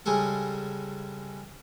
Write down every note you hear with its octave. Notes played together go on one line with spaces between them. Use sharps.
C#3 G3 G#3 G#4 A4